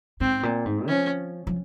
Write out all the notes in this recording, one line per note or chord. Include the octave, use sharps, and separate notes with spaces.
G#2 C4
A#2
G#2
F3 C#4
F3